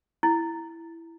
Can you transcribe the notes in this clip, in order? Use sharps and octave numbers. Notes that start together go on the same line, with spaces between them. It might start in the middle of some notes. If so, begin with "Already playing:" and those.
E4